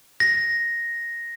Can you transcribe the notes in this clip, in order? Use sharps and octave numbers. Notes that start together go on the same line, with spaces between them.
A#6